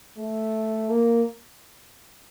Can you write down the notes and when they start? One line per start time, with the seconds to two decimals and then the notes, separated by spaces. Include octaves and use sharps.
0.18 A3
0.89 A#3